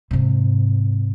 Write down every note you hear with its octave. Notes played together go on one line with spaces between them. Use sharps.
G#2 C3